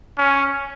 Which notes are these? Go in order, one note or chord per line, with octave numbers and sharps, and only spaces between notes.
C#4